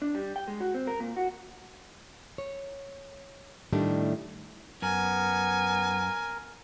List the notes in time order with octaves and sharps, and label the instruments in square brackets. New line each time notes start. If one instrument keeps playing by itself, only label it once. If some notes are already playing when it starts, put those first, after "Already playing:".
[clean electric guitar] D4
G3
G5
G#3
F#4
C4
A#4
A#2
F#4
[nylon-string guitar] C#5
A2 D#3 G3 A3 D4
[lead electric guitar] F#2 [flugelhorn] B3 [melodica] A#4 [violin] G#5